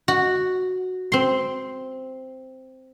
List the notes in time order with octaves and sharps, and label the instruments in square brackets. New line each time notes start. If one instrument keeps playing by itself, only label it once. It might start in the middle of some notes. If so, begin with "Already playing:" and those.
[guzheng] F#4
C4 C6